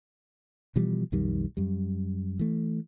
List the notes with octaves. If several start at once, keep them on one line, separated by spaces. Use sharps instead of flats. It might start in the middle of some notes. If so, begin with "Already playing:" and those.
B2 E3 F3 G3
B1 F2 D#3 G3
F#2 G3
E3 A3